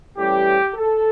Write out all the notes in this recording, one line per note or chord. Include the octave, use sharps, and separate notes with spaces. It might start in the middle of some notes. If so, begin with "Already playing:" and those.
A2 E3 G3 C#4 G4
A4